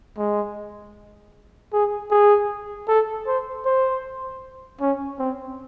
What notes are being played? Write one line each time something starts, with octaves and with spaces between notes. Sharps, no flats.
G#3
G#4
G#4
A4
C5
C5
C#4
C4